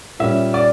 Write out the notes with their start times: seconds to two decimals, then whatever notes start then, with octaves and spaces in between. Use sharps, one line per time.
0.19 A#2 G3 C#4 E5
0.54 D5